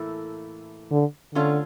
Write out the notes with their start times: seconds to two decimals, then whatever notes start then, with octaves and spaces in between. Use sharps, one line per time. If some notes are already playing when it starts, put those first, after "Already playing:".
Already playing: A2 E3 A#3 E4 A4
0.91 D3
1.34 D3 A3 C#4 F4 C#5 F5